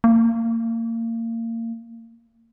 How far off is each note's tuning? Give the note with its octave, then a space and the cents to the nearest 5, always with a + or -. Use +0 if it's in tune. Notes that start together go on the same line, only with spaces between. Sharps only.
A#3 -30